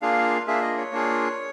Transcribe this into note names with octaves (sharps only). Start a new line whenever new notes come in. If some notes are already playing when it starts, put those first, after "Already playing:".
A#3 D4 F4 G#4 F5
A#3 D4 F4 G#4 E5
D#5
C#5
A#3 D4 F4 G#4